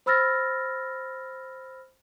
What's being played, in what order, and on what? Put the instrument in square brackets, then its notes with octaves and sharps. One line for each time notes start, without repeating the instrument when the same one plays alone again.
[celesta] C5 B5 E6 F6 A6 A#6